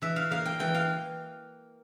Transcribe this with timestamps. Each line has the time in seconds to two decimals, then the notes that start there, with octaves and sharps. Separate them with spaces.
0.02 E3 E5
0.16 F5
0.31 A#3 F5
0.45 G5
0.60 E3 G5
0.74 F5